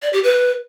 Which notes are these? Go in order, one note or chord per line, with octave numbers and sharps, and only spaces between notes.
D5
G4
B4